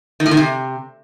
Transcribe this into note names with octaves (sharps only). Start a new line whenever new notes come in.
D#3
A2
D#3
C3